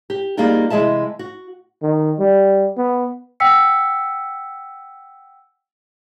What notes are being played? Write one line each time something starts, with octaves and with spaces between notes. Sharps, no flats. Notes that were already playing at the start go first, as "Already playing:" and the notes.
G4
G3 A#3 D#4 F4 G4 G#4
C3 E3 G#3 G#4 E5 A5
F#4
D#3
G3
B3
F#5 G5 E6 B6 C#7